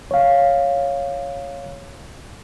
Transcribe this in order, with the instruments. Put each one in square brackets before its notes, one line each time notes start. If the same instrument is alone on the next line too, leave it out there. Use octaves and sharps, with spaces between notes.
[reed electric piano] C#5 F5